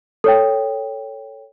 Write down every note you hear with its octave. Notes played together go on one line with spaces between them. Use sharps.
A4 C#5 G5